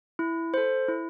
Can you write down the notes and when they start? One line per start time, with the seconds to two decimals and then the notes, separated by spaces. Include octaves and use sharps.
0.19 E4
0.54 A4 C5
0.89 E4